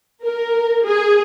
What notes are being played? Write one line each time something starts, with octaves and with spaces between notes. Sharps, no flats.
A#4
G#4